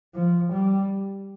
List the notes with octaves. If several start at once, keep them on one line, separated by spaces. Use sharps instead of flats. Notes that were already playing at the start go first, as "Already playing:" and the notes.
F3
G3